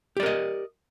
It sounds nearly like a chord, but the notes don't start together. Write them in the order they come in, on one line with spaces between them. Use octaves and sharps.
G4 D5 A#4 D#5